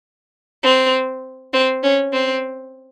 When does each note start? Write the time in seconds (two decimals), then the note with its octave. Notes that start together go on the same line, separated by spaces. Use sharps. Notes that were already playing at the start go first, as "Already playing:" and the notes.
0.63 C4
1.53 C4
1.83 C#4
2.13 C4